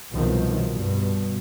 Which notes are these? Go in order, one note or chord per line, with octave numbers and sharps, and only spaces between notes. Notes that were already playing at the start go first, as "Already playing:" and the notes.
C2 B2 D#3 F3 F#3
G2 B2